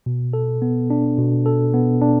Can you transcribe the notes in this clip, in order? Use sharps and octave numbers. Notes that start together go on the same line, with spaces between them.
B2
A4
B3
D4
B2
A4
B3
D4